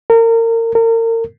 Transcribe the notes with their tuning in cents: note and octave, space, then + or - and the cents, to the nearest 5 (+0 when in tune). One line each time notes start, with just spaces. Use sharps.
A#4 -30
A#4 -35